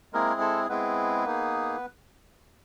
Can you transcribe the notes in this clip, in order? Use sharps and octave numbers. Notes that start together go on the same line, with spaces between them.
G#3 A#3 C4 E4 G#4 A#4
A4
G#3 B3 C4 E4 G#4 B4
A#3 D#4 G#4